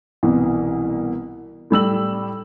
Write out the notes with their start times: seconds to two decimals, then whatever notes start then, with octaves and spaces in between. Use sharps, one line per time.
0.23 C2 B2 E3
1.70 A2 G3 E6 F#7